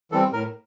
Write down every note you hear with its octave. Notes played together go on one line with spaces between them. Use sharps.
E3 G3 C4 A4
A2 A#4